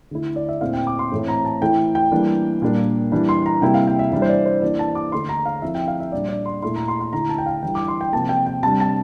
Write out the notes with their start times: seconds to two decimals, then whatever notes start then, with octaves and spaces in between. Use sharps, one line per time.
0.11 D3 A3 E4
0.36 D5
0.49 E5
0.61 A#2 A3 C4 E4 F5
0.74 G5
0.87 D6
0.99 C6
1.12 A2 E3 A3 C4
1.28 A#5
1.45 A5
1.61 E3 A3 E4 G5
1.95 G5
2.11 E3 G3 A#3 D4
2.62 A#2 G3 A#3 D4
3.12 E3 G3 D4
3.29 C6
3.46 A#5
3.62 C3 G3 A#3 E4 G5
3.74 F5
3.87 G5
3.99 E5
4.12 E3 G3 D4 E5
4.22 C5
4.29 D5
4.46 C5
4.62 E3 A#3 D4 D5
4.79 A5
4.95 D6
5.12 D3 A3 D4 C6
5.29 A#5
5.46 F5
5.62 F3 C4 E4 E5
5.75 G5
5.88 F5
6.00 E5
6.12 A#2 G3 D4 D5
6.29 D5
6.46 C6
6.62 A#2 A3 E4 C6
6.76 A#5
6.88 C6
7.00 C6
7.13 D3 A3 E4 A#5
7.29 A5
7.38 G5
7.46 F5
7.62 E3 G3 D4 G5
7.75 D6
7.88 C6
8.01 G5
8.13 C3 F3 A#3 A5
8.29 G5
8.46 G5
8.63 C3 G3 D4 A5
8.80 A5